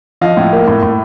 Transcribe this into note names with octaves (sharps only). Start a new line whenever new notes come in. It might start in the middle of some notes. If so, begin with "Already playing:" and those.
F3 D#5 F5
A2
A#3
A2
A2